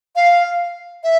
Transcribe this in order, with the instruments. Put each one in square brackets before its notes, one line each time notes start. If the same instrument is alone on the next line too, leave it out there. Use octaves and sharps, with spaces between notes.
[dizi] F5
E5